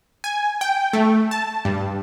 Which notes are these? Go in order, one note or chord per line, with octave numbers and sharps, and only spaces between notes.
G#5
G5
A3
A5
G2